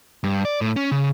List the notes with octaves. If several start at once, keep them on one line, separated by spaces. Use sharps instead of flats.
G2
D5
A2
C#4
C#3